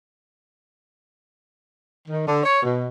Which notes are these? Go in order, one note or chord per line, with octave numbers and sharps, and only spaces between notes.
D#3
D3
C#5
B2